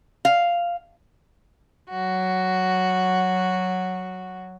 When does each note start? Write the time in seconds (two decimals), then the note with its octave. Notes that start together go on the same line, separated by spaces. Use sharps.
0.25 F5
1.91 F#3 F#4